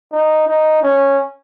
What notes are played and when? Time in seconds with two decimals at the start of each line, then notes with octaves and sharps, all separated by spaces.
0.12 D#4
0.48 D#4
0.83 C#4